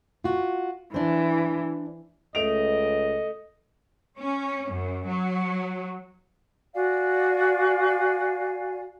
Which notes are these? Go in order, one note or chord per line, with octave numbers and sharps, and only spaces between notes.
F4 F#4
E3 D4 C5
C#2 A3 D#5 D7 F7
C#4
F#2
F#3
F#4 D5 F5 G#5